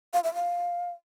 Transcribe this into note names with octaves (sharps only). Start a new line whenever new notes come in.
F5
E5
F5